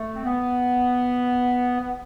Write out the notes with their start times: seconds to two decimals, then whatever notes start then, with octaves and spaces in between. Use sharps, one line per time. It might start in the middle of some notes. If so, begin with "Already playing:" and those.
Already playing: A3
0.14 C4
0.24 B3
1.80 B3